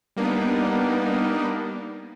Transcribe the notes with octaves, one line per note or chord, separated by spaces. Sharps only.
G3 A#3 B3 D4 D#4